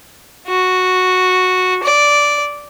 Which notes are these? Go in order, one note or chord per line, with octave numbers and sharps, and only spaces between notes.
F#4
D5